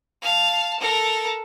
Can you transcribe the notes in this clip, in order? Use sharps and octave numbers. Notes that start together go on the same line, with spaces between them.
F5 A5
A4 A#4